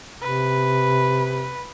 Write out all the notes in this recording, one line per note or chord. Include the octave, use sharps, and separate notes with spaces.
C3 B4